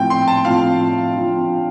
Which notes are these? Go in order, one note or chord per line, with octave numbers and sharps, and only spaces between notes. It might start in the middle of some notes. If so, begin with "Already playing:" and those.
Already playing: A2 F3 C4 F4 G5
C6
A5
A2 F3 C4 F4 F5
D3 F3 C4 F4